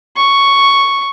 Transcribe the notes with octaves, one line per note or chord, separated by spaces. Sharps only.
C#6